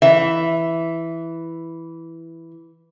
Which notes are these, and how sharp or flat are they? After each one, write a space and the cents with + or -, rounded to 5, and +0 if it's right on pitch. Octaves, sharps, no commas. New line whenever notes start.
E3 +0 E5 +0